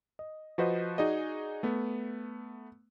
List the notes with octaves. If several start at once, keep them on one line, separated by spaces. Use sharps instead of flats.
D#5
F3 F#4 B4 C5 D#5
D#4 F#4 G#4 D5 D#5
A3 B3